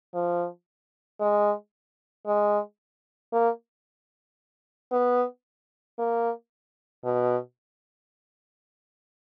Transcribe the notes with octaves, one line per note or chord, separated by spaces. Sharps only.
F3
G#3
G#3
A#3
B3
A#3
B2